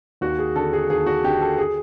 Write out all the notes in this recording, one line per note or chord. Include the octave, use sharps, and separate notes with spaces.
D#2 F#4
G#4
D3 A4
G#4
D#2 G#4
F#4
D3 G4
A4
G#4